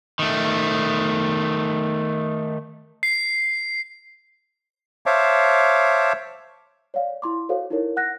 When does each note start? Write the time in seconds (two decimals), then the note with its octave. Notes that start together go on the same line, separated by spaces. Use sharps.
0.19 D#3 A3
3.03 C7
5.06 C5 C#5 E5 F5 A5 D6
6.94 C#5 D5 F5
7.22 E4 C6 D6
7.49 F#4 A4 C5 C#5 F5
7.70 D#4 E4 A4 A#4 C#5
7.97 F#5 F#6 A#6